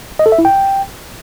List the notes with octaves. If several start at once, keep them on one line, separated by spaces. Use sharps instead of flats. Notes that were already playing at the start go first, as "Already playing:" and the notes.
D#5
A4
E5
E4
G5